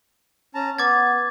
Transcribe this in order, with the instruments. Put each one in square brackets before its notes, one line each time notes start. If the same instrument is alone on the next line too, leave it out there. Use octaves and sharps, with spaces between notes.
[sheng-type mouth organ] C#4 A5 A#5
[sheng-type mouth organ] B3 [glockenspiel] D6 G#6 A6